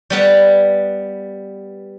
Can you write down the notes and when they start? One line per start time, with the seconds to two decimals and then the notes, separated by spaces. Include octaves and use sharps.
0.10 G3 B3 B4